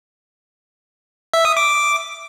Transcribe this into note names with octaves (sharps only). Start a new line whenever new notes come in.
E5
D#6
D6